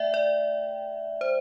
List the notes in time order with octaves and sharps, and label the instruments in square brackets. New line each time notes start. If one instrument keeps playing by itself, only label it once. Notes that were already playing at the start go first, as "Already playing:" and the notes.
Already playing: [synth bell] A3 D5 E5 G5
D5
C5